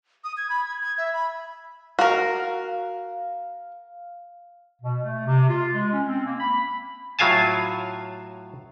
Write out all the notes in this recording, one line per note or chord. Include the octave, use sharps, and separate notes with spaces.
D#6
G#6
B5
G#6
G#6
E5
B5
F#4 A#4 F5
B2
A3
C3
F4
G#3
C#4
C4
A#3
B5
A2 F#3 F4 F5 G#5 A5